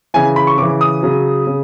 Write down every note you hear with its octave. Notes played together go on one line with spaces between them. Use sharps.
C#3 E3 G#5
B5
C#6
C#3 E3 D6
D#6
C#3 F#3
C#3